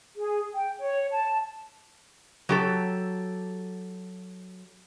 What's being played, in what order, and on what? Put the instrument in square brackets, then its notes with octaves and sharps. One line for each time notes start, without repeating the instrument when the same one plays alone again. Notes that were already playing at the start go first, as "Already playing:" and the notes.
[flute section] G#4
G5
C#5
A5
[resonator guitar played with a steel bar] F#3 G4 A4